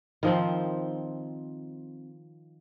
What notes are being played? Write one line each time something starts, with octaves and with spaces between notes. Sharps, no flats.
D#3 F3 C4